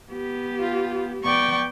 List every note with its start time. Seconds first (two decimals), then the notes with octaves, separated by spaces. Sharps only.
0.12 B3 G4
0.60 F4
1.23 B3 D5 G5 C#6